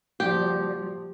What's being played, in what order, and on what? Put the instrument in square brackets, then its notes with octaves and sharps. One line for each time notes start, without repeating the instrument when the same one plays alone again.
[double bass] F#1 F3 [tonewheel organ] G3 F#4 D5 [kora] G4